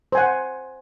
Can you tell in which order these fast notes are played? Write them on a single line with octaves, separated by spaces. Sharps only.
C5 G#5 F#5